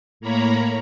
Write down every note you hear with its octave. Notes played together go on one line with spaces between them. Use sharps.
A2 A#3 C#5 A#5 B5